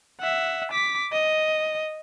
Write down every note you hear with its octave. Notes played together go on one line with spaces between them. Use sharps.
E5 F#5
D6 B6
D#5